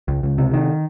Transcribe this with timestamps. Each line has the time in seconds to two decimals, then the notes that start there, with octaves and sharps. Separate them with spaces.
0.08 C#2
0.23 C#2
0.38 C3
0.53 D#3